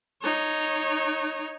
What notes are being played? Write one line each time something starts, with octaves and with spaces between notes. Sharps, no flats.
D#4 C#5